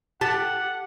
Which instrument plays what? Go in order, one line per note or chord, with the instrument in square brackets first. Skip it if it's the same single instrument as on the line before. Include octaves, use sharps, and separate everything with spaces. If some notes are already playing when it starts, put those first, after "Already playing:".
[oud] G4 [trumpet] F#5 [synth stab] A5